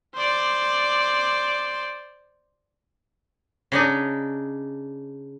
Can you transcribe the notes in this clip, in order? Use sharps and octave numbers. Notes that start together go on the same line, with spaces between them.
C5 D5
C#3 D4 D#4